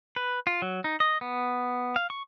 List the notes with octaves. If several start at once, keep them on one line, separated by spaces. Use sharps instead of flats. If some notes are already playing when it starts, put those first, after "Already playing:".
B4
F4
F#3
D#4
D#5
B3
F5
C#6